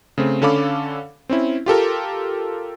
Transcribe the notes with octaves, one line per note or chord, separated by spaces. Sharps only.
C#3 A3 C4
D3 C#4 A4 F5 B5 D6
C4 C#4 E4
F4 G4 A4 A#4